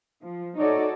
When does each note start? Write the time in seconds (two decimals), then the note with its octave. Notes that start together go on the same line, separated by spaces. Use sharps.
0.22 F3
0.58 D#4 F#4 A4 C#5 D5